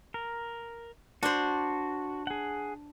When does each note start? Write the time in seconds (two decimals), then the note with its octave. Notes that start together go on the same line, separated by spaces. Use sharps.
0.14 A#4
1.23 D4 F#4 C5
2.27 G#4 F#5